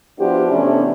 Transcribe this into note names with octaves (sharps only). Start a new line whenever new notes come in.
F3 B3 D4 E4 F#4 G4
C3 E3 A3 B3 C#4 D4